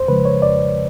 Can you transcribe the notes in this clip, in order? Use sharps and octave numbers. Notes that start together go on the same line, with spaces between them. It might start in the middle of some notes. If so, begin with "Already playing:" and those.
Already playing: F2 C5
C#3 F3 G#3 B4
C#5
F2 D5